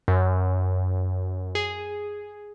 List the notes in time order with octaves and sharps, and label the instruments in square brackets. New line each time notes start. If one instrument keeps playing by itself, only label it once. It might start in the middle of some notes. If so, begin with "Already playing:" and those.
[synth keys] F#2
G#4